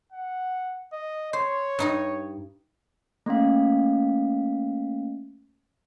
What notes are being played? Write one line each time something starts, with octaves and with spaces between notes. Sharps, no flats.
F#5
D#5
C5 C#5
G2 D#4 D#5
A3 A#3 C#4 F5